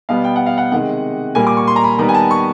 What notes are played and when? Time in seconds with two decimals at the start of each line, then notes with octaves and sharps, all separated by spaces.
0.09 B2 G3 B3 F5
0.24 G5
0.36 F#5
0.46 F5
0.58 F#5
0.72 C3 D#3 G#3 F#5
1.35 A#2 G3 A#3 G#5
1.47 D6
1.57 C#6
1.67 C6
1.76 A#5
1.84 B5
1.98 D#3 G3 B3 A#5
2.09 G#5
2.14 A5
2.31 C#6